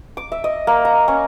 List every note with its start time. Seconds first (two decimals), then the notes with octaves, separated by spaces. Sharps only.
0.17 D6
0.32 E5
0.44 D#5
0.67 A#3
0.85 A#5
1.08 C#4